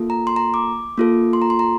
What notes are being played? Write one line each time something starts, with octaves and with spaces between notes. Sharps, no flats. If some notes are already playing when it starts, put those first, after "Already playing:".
Already playing: A#3 F4 A4
A#5
C6
A#5
D6
A#3 F4 A4
C6
A#5
C6
A#5